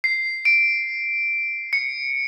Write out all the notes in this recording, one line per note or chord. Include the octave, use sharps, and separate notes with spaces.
C7
D7
C#7